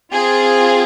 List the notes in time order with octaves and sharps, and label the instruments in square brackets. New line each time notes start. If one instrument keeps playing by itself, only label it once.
[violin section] C4 F4 G#4